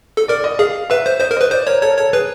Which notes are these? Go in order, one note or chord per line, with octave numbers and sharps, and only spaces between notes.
A4
A#4 D5
D#5
G#4 F5
B4 E5
C5
C5 D#5
A#4
B4 D#5
C5 D5
A#4 C#5
A4 C#5
A#4
A4 C#5
G#4 B4